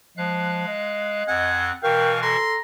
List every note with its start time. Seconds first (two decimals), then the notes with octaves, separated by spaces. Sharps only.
0.17 F3 G#3 F5 F#6
0.67 D#5
1.28 F2 C4 F#5 G#5
1.83 B2 E3 A#4 F5 G5 C#6
2.23 A4 A#5 C6